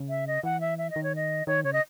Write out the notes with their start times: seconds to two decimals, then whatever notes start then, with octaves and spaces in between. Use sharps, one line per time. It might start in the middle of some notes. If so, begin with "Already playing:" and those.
Already playing: C#3
0.09 E5
0.27 D#5
0.43 E3 F#5
0.61 E5
0.78 E5
0.90 D#5
0.96 D#3
1.03 C#5
1.16 D#5
1.47 D#3 C#5
1.64 C#3 C#5
1.73 D#5